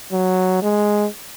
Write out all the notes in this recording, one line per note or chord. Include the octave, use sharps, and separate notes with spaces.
F#3
G#3